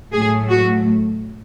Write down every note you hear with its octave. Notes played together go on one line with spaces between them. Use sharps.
A2 F#3 A3 G#4
F#4